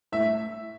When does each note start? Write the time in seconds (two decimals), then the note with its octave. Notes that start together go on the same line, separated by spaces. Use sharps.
0.12 A2 E5